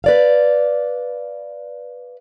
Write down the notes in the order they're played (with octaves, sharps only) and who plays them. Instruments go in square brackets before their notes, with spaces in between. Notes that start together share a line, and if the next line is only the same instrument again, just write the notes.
[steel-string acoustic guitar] B4 D5 F5